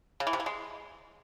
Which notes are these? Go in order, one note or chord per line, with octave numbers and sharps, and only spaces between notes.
C#3
E3
C3
E3
G#3